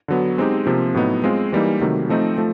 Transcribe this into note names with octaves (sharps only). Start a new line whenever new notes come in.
D3 F#3 B3
G#3 C4 D#4 G4
C3 F3 A#3
A2 F#3 B3 D#4
G#3 C4 F4
E3 G3 A#3 D#4
C3 D#3 F#3 A3
F3 A3 C4 D#4
F3 A3